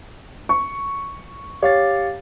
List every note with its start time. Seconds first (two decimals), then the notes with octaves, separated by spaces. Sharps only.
0.49 C#6
1.62 G4 C#5 F5 A6